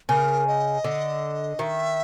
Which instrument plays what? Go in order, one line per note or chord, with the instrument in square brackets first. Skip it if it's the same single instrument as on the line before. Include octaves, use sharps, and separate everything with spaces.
[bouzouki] C#3 [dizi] A#4
[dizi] D#5
[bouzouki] D3
[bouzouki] D#3 [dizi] E5